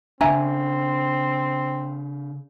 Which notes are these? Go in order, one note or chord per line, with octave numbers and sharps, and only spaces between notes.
C#3 C4 D4 E5 G#5 A#5